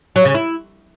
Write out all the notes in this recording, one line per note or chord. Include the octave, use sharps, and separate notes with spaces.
F#3
C#3
E4